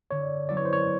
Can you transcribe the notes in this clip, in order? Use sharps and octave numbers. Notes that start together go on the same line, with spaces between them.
D3 C#5
F#3 B3 E4 A4 D5
C#5
C5
C#5